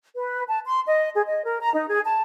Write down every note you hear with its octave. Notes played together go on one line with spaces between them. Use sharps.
B4
A5
C6
D#5
G#4
D#5
A#4
A#5
D#4
G#4
A5